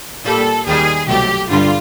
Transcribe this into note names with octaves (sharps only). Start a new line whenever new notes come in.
A#2 G3 A4
D#2 D#3 G3 G#4
C2 B2 F#3 A3 G4
G2 D3 G3 F4